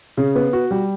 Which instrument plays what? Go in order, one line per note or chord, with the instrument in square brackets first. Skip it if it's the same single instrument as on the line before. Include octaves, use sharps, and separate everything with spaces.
[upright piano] C#3
B3
F#4
G3